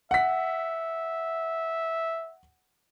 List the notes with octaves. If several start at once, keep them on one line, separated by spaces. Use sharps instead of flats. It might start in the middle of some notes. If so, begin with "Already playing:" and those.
E5 F#5 B6